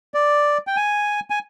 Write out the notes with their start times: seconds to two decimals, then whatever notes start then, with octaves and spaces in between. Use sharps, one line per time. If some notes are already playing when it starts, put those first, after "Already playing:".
0.14 D5
0.67 G5
0.77 G#5
1.30 G#5